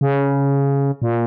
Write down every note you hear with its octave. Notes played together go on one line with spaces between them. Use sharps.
C#3
A#2